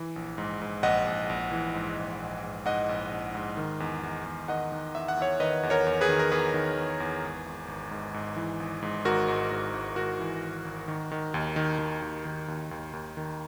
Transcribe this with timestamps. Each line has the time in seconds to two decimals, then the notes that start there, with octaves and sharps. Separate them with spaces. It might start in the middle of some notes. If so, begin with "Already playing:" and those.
Already playing: E3
0.16 A#1
0.38 G#2
0.61 G#2
0.83 A#1 D#5 F#5
1.07 A#1
1.30 A#1
1.52 E3
1.74 G#2
1.97 A#1
2.20 A#1
2.43 G#2
2.66 G#2 D#5 F#5
2.89 A#1
3.11 A#1
3.35 G#2
3.57 D#3
3.80 E2
4.03 E2
4.26 E2
4.48 D#3 D#5 F#5
4.72 D#3
4.95 E2 E5
5.08 F#5
5.17 E2 C#5 E5
5.40 D#3 B4 D#5
5.63 E2
5.70 A#4 C#5
5.86 E2
6.01 G#4 B4
6.09 D#3
6.19 A#4
6.32 E2 G#4 B4
6.54 D#3
6.77 E2
7.00 E2
7.23 G#1
7.46 G#1
7.68 G#1
7.91 G#2
8.14 G#2
8.36 E3
8.60 G#1
8.82 G#2
9.05 G#1 F#4 A#4
9.28 G#2
9.51 G#2
9.73 G#1
9.96 G#1 F#4 A#4
10.20 E3
10.43 G#1
10.65 G#1
10.88 D#3
11.12 D#3
11.34 D#2
11.56 D#3
11.79 D#3
12.02 D#2
12.25 D#3
12.48 D#2
12.71 D#2
12.93 D#2
13.17 D#3